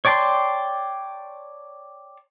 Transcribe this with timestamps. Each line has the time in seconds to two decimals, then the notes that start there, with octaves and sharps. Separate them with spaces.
0.05 C#5 D5 G5 A5 C6